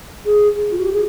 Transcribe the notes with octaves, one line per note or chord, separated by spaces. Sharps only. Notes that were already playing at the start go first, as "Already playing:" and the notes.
G#4
F4
F#4
G4
G#4